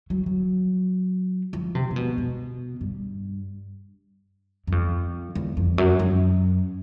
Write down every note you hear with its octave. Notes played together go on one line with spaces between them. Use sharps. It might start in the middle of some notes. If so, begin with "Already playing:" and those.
F#3
F#3
F3
C3
C3
B2
B2
G2
F#2
F2
E2
F2
F#2
F#2